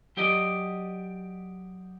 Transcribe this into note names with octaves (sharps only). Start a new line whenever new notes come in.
F#3 G4 D5 D#5